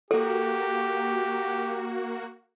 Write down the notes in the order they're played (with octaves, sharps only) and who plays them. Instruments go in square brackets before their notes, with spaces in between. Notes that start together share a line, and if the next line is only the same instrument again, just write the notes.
[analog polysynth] A#3 F#4 [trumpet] G4 [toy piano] A4